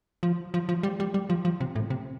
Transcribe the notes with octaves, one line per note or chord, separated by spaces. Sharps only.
F3
F3
F3
G3
G3
G3
F3
F3
C3
A2
C3